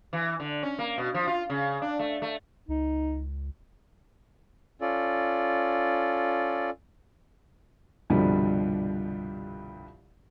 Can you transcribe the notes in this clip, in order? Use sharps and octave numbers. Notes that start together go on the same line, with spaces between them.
E3
D3
C#4
A#3
B2
F3
F4
C#3
D4
A3
A3
C#2 D#4
C#4 F4 A4 D5
C2 G2 B2 D3 F3 G3